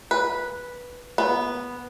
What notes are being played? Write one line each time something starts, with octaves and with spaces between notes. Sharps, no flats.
B4
B3